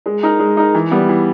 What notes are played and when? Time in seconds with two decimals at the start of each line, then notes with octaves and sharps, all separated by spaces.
0.06 G#3
0.23 D#4 A#4
0.39 G#3
0.57 D#4 A#4
0.74 E3
0.91 G3 B3
1.09 E3